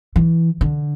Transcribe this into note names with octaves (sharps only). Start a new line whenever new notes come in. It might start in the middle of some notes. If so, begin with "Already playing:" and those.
E3
D3